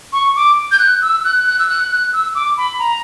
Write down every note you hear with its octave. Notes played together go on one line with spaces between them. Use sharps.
C#6
D6
G6
F#6
E6
F#6
F#6
E6
F#6
F#6
E6
D6
B5
A#5